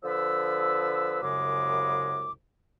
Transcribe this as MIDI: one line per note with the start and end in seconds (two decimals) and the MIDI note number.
0.03 1.18 50
0.03 1.18 53
0.03 1.18 71
0.03 1.18 88
1.21 2.31 36
1.21 2.31 42
1.21 2.31 49
1.21 2.31 56
1.21 2.31 86